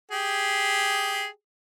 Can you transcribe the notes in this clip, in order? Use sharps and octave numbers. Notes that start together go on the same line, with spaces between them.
G4 G#4